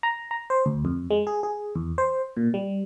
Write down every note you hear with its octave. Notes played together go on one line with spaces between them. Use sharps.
A#5
A#5
C5
D2
F2
G#3
G#4
G#4
E2
C5
A#2
G3